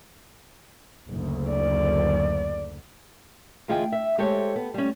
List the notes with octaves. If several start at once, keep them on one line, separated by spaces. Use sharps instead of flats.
F#1 D2
D5
D2 E3 F4 G#4 D#5 G5
E5
G#3 G4 A4 C5 C#5
B3
G3 C#4